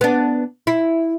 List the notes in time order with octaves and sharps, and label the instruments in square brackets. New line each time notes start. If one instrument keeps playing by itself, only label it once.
[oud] B3 D4
E4